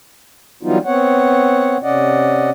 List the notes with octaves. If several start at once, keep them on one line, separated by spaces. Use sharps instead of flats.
E3 F#3 G3 B3 D#4 F4
B3 C4 C#5 F#5
C3 C#4 D5 D#5 F#5